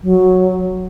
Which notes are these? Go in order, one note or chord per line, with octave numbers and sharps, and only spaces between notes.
F#3